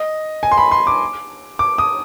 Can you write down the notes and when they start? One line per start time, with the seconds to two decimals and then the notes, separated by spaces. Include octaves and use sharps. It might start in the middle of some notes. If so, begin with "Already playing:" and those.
Already playing: D#5
0.43 G#5
0.52 C6
0.58 B5
0.72 C6
0.87 D6
1.59 D6
1.78 D#6